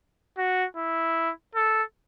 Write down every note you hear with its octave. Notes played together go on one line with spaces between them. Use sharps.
F#4
E4
A4